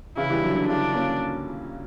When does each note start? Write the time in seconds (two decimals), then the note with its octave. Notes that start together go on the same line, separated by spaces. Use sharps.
0.17 C#3 E3 E4
0.30 E3 G3
0.43 D3 F#3
0.56 D3
0.69 C#3 E3 D4
0.94 A#3 C#4